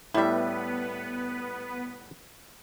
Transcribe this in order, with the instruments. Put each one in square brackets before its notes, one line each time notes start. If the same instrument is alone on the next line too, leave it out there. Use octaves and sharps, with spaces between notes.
[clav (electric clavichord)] A2 G3 [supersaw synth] B3 B4 [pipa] E4 E5